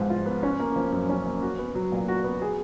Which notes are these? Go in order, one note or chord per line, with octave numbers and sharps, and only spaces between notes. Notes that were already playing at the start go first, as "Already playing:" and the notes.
Already playing: G#2 F3 B3
F4
B3
C#4
A#3
F3
F#2
C#4
A#3
F#4
B3
F#3
A#2
F#4
B3
G#4